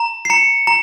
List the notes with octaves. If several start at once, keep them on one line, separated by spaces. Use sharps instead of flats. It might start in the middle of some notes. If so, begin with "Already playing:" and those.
Already playing: A#5
C7
A#5 C#7
A#5